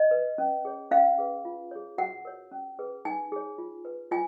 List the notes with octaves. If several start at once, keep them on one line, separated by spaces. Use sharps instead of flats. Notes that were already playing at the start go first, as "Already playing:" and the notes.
Already playing: D#5
B4
C#4
G#4 C#5
C#4 F5
G#4 B4
F4
G#4 C#5
F#4 F#5
A#4 C#5
C#4
G#4 B4
D#4 G#5
G#4 C#5
F4
B4
F4 G#5